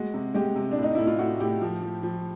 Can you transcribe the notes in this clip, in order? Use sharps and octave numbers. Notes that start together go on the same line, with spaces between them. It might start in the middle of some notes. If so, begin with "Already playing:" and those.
Already playing: G#3 F#4
C3
G#3 G4
C3
D4
A2
D#4
A2 E4
F4
A2 F#4
A2 G4
F3
F3
F3